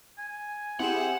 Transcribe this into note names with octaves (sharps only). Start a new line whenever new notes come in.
G#5
C4 E4 G4 G#4 F#5 E7